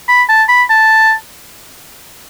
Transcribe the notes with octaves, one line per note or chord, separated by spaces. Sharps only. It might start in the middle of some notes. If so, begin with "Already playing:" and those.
B5
A5
B5
A5